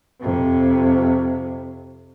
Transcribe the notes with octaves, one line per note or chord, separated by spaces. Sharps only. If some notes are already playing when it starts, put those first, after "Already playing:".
F2 C3